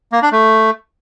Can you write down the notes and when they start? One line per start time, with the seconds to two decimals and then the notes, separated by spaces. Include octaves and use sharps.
0.12 A#3
0.22 D4
0.32 A3